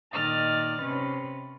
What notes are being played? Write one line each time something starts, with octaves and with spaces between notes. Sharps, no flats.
A#2 D#3 D5 D#5 F6 A6
C3 C#4 B4